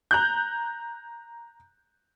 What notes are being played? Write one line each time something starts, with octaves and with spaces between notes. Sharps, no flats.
A#5 F#6 G6